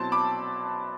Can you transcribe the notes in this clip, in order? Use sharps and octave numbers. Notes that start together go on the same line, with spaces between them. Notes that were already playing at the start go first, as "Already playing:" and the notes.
Already playing: B2 F#3 C4 E4 A5 C6
B5 D6